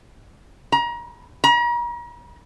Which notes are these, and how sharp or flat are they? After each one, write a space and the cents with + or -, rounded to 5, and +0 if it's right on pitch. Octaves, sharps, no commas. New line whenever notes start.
A#5 +30
A#5 +40